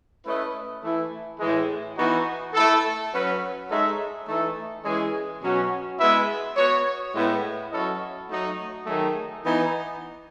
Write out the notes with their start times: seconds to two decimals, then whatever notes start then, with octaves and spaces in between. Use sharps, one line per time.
0.24 A3 C#4 E4 B4 D#5
0.82 E3 A3 E4
1.40 A2 E3 G#3
1.98 E3 B3 D#4 F#4
2.54 A3 E4 A4
3.13 F#3 C#4 F#4 B4
3.70 G#3 D#4 A4 C#5 E5
4.27 E3 A3 D#4 A4 E5
4.84 E3 G#3 C#4 G#4
5.42 B2 F#3 C#4 F#4
5.99 G#3 B3 E4 B4 E5
6.57 B3 F#4 C#5
7.14 A2 G#3 B3
7.72 F#3 C#4 E4 A4 D#5
8.29 F#3 A3 D#4 F#4 C#5
8.87 D#3 F#3 A3 D#4 G#4
9.45 E3 B3 D#4